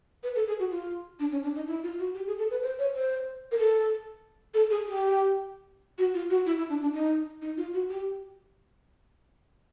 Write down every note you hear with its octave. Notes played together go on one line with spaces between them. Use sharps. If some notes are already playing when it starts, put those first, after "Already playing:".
B4
A4
G#4
F#4
F4
D4
C#4
D4
D#4
E4
F4
F#4
G4
G#4
A4
B4
C5
C#5
C5
A#4
A4
A4
G#4
G4
F#4
F4
F#4
E4
E4
D4
D4
D#4
D#4
F4
F#4
G4